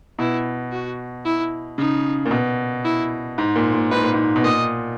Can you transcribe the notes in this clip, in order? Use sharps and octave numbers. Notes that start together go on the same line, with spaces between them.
B2 E4
F#4
E4
C#3 D#4
A#2
B2
E4
G#2
A#2
A#2
G#2 B4
A#2
G#2
B2
A#2 D#5